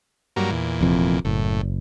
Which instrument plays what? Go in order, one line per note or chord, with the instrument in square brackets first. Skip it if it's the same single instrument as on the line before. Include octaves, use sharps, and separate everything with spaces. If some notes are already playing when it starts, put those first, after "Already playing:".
[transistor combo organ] G2 F#3 A#3
E2 A#2
[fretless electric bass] F1 F2
[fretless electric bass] F#1 [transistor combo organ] A2